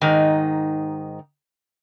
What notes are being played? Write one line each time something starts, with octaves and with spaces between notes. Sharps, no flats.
G#2 D#3 D#4